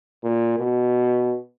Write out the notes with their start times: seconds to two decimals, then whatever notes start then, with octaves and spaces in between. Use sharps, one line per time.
0.24 A#2
0.59 B2